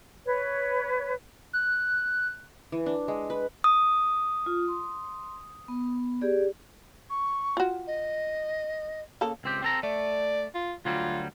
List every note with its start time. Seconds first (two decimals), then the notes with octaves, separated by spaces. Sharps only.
0.25 B4 C#5
1.53 F#6
2.72 E3
2.86 D4
3.08 G#3
3.30 B4
3.64 D#6
4.46 F4
4.68 C6
5.68 B3
6.21 G4 G#4 D5
7.09 C#6
7.57 F4 F#4
7.87 D#5
9.21 C#3 A#3 A4
9.44 C#2 C4 G4
9.63 C4 A4 A#5
9.83 A3 D5
10.54 F4
10.85 D2 F#3 G3 F4